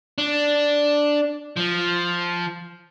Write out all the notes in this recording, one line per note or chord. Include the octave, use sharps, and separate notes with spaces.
D4
F3